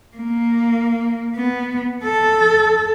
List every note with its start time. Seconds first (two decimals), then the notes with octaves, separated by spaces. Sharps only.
0.17 A#3
1.36 B3
2.03 A4